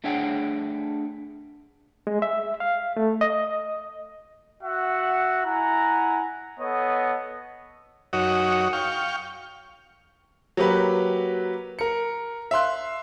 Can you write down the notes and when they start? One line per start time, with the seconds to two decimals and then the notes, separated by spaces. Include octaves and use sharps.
0.04 A3 D4 G#4 C#5 F#5 G5
2.07 G#3
2.22 E5
2.60 F5
2.97 A3
3.21 D#5
4.63 F#4 E5 F#5
5.45 E4 F#5 G#5 A#5
6.59 B3 A4 C#5 D#5 F#5
8.13 F#2 D#4 F#4 C#5
8.73 F5 G5 C#6
10.57 F#3 A#3 G4 B4
11.79 A#4 C#7
12.51 E5 F5 C6 F#6